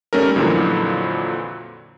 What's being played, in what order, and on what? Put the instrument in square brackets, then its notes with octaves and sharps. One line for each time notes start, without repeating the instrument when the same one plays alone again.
[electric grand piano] G3 A3 C#4 D#4 A#4
F2 A#2 D3 E3 F#3